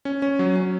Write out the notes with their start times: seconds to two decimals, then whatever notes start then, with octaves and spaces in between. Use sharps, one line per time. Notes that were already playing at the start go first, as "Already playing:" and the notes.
0.05 C#4
0.22 C#4
0.39 F#3
0.56 C#4